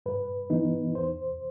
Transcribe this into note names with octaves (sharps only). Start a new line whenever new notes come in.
G2 B4
E3 B3 D#4
E2 C5